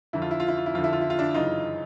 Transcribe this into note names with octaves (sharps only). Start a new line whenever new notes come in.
F2 D3 E4
F4
E4
F4
E4
F4
E4
F2 D3 F4
E4
F4
E4
F4
D4 E4
F#2 C#3 E3 D#4 F4